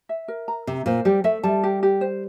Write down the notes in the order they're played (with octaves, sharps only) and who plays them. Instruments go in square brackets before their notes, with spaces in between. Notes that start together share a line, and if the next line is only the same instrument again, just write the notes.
[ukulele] E5
A#4
A#5
[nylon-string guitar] C3 [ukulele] E5
[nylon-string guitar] A#2 [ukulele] C5
[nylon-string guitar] G3 [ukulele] G4
[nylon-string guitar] A3 [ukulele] E5
[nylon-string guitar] G3 [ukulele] A5
[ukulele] G4
G4
C5